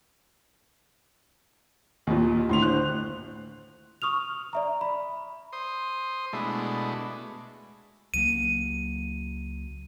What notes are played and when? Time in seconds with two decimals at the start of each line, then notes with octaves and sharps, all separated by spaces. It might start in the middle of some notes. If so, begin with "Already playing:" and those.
2.07 D#2 A#2
2.49 D2 A2 C6 F7
2.62 C5 F#6
4.02 C#6 D#6 F6 F7
4.53 D5 E5 A#5
4.81 B5
5.53 C5 C6 D#6
6.33 B2 G#3 A3 D4 E4
8.14 C#2 F#3 A#3 D#7